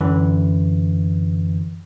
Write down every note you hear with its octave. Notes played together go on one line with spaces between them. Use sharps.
F#2 D3 E3